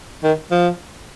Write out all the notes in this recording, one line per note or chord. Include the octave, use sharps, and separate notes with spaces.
D#3
F3